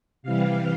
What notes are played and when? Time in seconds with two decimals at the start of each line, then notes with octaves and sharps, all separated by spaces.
0.23 C3 E3 G3 F5